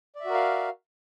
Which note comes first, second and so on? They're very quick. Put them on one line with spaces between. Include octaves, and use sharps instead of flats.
D5 E5 F#4 A#4 F5